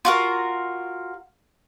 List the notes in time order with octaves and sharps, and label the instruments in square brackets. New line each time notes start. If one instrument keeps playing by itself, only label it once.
[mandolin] F4 F#4 A#4